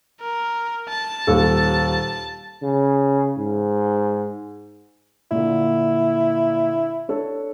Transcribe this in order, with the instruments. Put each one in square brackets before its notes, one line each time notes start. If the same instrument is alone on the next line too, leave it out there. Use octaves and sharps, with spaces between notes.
[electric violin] A#4
A5
[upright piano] D#1 D#2 A4
[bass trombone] C#3
G#2
[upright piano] A#2 D3 [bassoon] E4
[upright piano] D4 A4 C#5